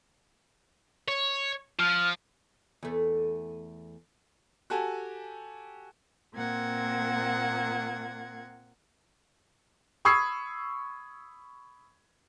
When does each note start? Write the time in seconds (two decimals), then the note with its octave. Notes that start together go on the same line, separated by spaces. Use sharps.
1.08 C#5
1.79 F3 F6
2.83 E2 A3
4.70 F#4 G4 A4 G#5 A5
6.33 A#2 A#3 C4 F#5 G#6
10.05 B5 C#6 D#6 E6 G#6 C7